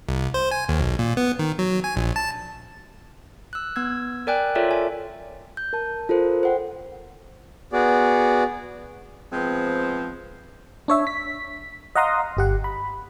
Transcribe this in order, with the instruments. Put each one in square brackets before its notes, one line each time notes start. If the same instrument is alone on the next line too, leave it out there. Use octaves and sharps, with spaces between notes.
[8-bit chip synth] C2
C5
G#5
D#2
B1
A#2
B3
D#3
F#3
G#5
A#1
A5
[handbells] E6 F#6
B3 E6 G#6
A#4 D5 G5 G#5 F#6
F4 A4 A#4 C#5 D5 E5
G#5
[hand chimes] G6
A#4 A5
F4 A4 A#4 C5
C5 F#5 G5
[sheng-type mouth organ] B3 F#4 G#4 D5
[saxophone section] F3 G#3 B3 C4
[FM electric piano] D4 C#5 E5
B6
D#5 F5 F#5 A#5 C6 D#6
G1 G4 F#5
B5